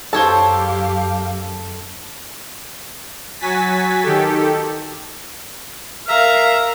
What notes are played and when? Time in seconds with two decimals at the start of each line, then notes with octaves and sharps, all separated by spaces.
0.13 F#2 G4 A4 C5 C#5 F5 A5
3.40 F#3 F#4 G#5 A6 B6
4.03 D#3 G4 A4
6.08 A#4 E5 F5 A#5